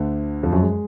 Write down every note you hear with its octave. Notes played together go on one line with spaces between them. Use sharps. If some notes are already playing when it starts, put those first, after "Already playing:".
Already playing: D2 D3
F2 F3
F#2 F#3
G#3